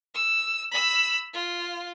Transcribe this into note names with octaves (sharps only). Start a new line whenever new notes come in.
E6
B5 E6
F4